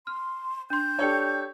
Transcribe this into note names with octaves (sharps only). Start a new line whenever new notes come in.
C6 F6
D4 C6 G6
D4 G4 A4 C#5 D5 C#7